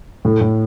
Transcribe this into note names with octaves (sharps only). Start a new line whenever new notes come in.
A2
A2